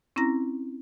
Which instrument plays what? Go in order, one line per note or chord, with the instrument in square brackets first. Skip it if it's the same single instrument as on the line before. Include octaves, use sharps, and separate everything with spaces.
[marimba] C4 C#4 E4 A#5 A#6